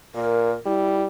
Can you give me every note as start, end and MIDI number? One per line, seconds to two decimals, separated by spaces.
0.15 0.54 46
0.15 0.55 70
0.66 1.07 55
0.66 1.03 64